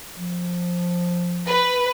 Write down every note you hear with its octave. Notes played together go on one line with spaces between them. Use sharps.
F3
B4